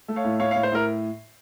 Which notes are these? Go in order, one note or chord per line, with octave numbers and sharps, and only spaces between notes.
A3
C#5 F5
A2
A2 C#5 F5
C#5 F5
A2
C5
A2 A#4